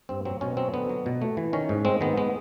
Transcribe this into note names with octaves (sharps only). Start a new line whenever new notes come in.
G2 C4
F#3 C4
B2 C#4
F#3 C4
D3 B3
F#3
B2
A3
E3
D#3 C#4
G#2
G#3 C4
D#3 B3
G#3 B3